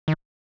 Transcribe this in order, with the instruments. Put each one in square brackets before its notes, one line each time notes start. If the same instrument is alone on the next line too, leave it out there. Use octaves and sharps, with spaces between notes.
[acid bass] D#3